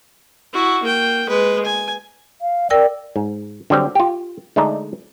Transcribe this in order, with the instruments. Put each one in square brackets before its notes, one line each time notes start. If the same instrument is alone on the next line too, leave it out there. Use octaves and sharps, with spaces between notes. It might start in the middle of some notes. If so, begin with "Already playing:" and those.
[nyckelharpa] E4 F#4
A#3 G5
G#3 B4
G#5
[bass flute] F5
[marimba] A#4 G5 E6 [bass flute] D5
[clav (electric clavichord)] G#2
D3 F#3 G3 C4
F4 G4
D3 G#3 A3 D4 D#4